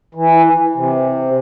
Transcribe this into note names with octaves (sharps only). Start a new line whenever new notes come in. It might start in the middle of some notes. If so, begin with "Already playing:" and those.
E3
C3